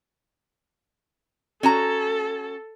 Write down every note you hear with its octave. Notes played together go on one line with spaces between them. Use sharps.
C#4 F#4 A4 A#5